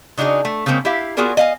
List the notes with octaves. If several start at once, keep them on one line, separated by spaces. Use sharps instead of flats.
C#3 D4 D#4 F#4 G#4
A3
C#3 G#3 A#3 C4 C#4
E4 G4 E5 F5
B3 F4 F#4 G#4 A#4 D5
D#5 F5 G#5